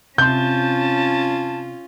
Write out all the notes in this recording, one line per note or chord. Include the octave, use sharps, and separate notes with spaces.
C3 C#4 F4 A5 C6 G6